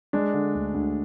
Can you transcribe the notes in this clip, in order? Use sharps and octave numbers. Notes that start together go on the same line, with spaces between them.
G#3 D4
D3
D2
D2